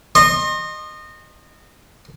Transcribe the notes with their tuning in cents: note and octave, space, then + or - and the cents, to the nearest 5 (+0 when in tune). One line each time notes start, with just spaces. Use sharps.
D#5 -25 C6 +30